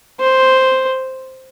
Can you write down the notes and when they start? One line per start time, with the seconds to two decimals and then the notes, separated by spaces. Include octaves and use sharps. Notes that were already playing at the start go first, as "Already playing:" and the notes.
0.21 C5